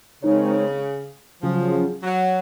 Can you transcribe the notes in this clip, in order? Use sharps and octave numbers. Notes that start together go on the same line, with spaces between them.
C#3 G#3 C4 D#4 A#4 C#5
C#3 F3 F#3 C#4 F4 G#4
F#3